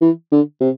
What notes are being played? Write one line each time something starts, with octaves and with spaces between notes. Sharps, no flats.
E3
D3
C3